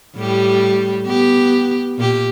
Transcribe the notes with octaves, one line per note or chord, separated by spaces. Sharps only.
A2 G3 G4
B3 G4
A#2 G4